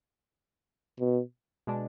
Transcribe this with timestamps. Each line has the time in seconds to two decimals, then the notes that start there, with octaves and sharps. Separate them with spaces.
1.00 B2
1.67 B2 G#3 D4